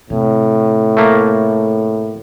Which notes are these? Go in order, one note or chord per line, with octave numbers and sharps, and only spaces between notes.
A2 C3
A3 A#3